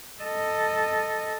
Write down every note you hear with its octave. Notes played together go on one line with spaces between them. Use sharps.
A4 D#5